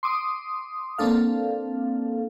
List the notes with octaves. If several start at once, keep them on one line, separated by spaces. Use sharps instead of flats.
C6 D6 D#6
A#3 C4 D4 A4 F5